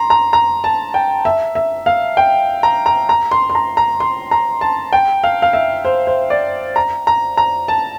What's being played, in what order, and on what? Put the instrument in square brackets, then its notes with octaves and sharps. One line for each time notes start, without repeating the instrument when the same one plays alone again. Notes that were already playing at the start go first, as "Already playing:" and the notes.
Already playing: [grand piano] A#5 C6
A#5
A#5
A5
G5
E5
E5
F5
G5
A#5
A#5
A#5
C6
C6
A#5
A#5
C6
A#5
A5
G5
F5
F5
E5
C5
C5
D5
A#5
A#5
A#5
A5